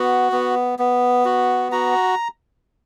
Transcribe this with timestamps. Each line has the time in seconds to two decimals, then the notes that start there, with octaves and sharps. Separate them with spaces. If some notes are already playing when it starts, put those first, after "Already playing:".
Already playing: B3 F#4
0.32 B3
0.79 B3
1.25 F#4
1.72 F#4 A#5